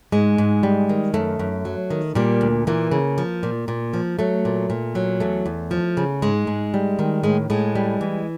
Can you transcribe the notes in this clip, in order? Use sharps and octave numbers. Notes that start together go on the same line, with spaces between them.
G#2 G#3
G#2
G3
D#3
F#2 A3
F#2
F#3
D#3
A#2 G3 A#3
D2
A#2 E3 A#3
C#3
F3
A#2
A#2
F3
F#3 A3
A#2
A#2
F#3
E2 A3
E2
F3
C#3
G#2 G#3
G#2
G3
D#3
A2 G#3
A2 G#3
G3
E3